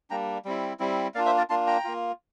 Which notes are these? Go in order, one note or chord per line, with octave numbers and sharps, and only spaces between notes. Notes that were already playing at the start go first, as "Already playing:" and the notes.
G3 A#3 D4 G5 A#5
G3 C4 E4
G3 C4 E4
A#3 D4 F4 D5 F5
C5 E5
A#4 D5
A#3 D4 F4 A5 C6
G5 A#5
A#3 F4